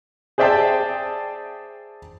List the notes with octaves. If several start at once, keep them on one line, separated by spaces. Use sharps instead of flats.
G#4 C5 D5 E5 G5 A5